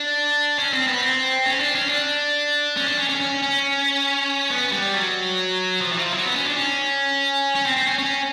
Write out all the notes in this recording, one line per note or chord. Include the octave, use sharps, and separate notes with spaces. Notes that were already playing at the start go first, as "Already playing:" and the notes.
Already playing: D4
C#4
C4
B3
C4
C#4
D4
C#4
D4
C#4
D4
C#4
C#4
C#4
C#4
B3
G3
F#3
F3
E3
F3
F#3
B3
C#4
D4
C#4
C#4
C4
C4
C#4
C#4